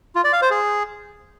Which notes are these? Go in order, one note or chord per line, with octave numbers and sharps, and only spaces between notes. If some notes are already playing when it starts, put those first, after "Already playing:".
F4
D5
F5
C5
G#4